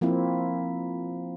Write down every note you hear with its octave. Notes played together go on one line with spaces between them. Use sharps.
F3 A#3 C4 E4